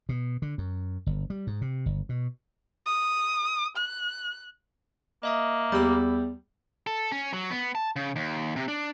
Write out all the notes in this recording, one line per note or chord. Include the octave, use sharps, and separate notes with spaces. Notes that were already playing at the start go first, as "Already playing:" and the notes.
B2
D3
F#2
G1
G3
G#2
C3
G1
B2
D#6
F#6
A#3 D#5 E5 D#6
E2 G3 B5 D6 E6
A4
C#4
F#3
B3
A5
C#3
D#2
C3
D4